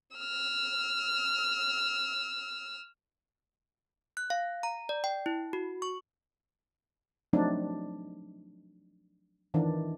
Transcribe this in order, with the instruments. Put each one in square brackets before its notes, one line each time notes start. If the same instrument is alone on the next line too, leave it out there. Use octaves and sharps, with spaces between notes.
[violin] E6 F6
[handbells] F#6
F5
A#5
D5
G5
E4
F#4
C#6
[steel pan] F3 F#3 A3 C4 D4 D#4
D#3 E3 D4